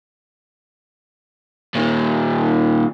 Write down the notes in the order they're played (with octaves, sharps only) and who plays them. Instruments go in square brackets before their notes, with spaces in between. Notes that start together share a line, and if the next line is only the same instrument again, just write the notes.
[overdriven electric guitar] A#2 D#3